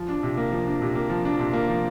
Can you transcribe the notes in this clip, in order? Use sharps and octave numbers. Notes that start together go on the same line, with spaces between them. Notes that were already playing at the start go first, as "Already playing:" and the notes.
Already playing: F3
D4
C3
A#3
F3
D4
C3
A#3
F3
D4
C3
A#3
F3